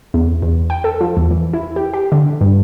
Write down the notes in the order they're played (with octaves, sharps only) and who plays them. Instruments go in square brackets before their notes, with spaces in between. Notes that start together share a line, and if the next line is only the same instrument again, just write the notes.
[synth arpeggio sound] E2
E2
G5
A4
F3
E2
E3
E4
G4
G4
D3
G2